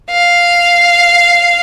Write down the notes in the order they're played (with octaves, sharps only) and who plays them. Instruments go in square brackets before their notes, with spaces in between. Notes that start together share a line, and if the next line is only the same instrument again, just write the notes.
[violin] F5